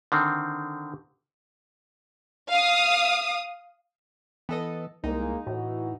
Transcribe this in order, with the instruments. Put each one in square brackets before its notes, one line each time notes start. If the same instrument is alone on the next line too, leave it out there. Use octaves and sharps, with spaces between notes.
[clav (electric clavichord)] D3 D#3 C4
[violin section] F5 D#6
[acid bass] E3 [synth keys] B3 A4 D#5
[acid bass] C2 [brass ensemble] G#3 A#3 [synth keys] D#4
[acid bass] A2 [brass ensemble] E3 F#4